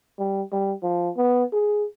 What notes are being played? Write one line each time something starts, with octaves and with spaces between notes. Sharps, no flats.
G3
G3
F3
B3
G#4